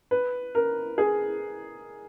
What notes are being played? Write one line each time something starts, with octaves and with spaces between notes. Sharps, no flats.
B4
A#4
G#4